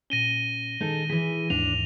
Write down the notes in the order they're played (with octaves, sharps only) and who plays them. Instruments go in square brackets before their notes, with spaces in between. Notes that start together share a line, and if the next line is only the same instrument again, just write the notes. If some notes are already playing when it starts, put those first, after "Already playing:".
[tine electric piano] A#2 C#4 [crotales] A#6 D#7 G7
[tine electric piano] D#3 [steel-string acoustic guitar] D#4 G#4 A4
[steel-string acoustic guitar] E3 G#4 [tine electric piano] B6
[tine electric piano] D#2 G#2 [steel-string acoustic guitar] D4 [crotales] F7